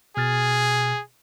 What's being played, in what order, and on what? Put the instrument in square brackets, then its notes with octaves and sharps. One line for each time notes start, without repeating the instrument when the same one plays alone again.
[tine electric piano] B2 F6 A6 [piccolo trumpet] G#4